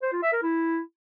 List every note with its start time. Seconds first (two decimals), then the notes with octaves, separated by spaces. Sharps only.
0.03 C5
0.13 F4
0.23 E5
0.33 A#4
0.43 E4